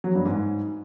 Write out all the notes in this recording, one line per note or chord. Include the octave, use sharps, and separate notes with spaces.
F#3
G2
G#2